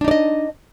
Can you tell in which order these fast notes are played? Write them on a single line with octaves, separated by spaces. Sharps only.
D4 D#4 D5 D#5